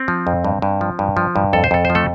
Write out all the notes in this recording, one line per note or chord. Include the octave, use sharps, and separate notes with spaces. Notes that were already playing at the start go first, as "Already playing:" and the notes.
Already playing: C4
F3
F2
G2
G2
F3
G2
F3
G2
F2 A4
C5
F2 A4
C5
F3
A3 A4